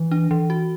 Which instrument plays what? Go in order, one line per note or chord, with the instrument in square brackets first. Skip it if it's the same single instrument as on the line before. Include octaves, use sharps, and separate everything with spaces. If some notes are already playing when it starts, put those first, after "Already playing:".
Already playing: [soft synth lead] E3
[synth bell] D4
E3
F#4